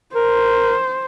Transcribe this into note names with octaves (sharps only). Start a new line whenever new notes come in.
A#4 C5